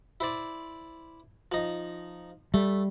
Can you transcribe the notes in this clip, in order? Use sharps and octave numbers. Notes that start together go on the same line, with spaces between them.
E4 C5 D5
F3 D#4
G3 A3